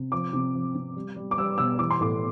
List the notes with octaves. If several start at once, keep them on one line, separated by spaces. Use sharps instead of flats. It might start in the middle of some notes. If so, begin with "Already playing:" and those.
Already playing: C3
F3 D6
C3
F3
C3
G3
G3
D6
G3 E6
B2 E6
E3 D6
C6
A2 D6